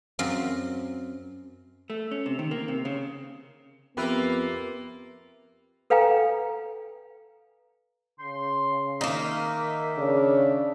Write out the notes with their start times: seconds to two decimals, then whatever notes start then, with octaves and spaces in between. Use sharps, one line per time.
0.19 F#2 C4 F5
1.90 A3
2.11 C#4
2.26 C3
2.39 D#3
2.51 A#3
2.68 C3
2.85 C#3
3.97 F2 A#3 B3 F4 G4 A#4 B4 E5
5.90 A4 B4 F5 G5 G#5 A#5
8.20 C#3 C6
9.01 D#3 A#3 D#4 E5 D6
9.98 C#3 D4